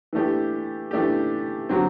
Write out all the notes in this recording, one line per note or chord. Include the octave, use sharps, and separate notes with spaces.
E3 A3 D4 G4
E3 A3 D4 G4
D3 F#3 C4